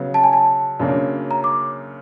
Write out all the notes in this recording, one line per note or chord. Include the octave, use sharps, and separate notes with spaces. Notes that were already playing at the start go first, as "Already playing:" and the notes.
Already playing: C#3 F#3 B3
A5
G#5
A5
F#2 C#3 F#3 A#3 D4
A#5
D6